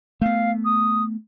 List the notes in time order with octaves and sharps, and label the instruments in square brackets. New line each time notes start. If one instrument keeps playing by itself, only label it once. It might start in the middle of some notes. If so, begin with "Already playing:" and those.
[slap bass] A3 B3 [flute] F5
[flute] D#6